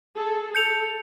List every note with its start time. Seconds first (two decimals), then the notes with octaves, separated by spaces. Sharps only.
0.15 G#4 A4
0.55 A4 G6 C#7 F7